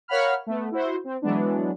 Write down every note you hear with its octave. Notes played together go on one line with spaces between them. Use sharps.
A#4 C#5 F5 F#5 B5 F6
A3 B3
E4 F#4 C5
C4
E3 F#3 G#3 B3 D4